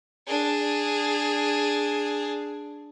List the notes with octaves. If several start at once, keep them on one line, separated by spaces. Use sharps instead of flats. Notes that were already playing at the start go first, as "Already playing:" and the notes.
D4 G#4